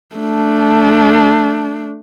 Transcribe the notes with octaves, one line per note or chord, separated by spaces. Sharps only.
A3 D4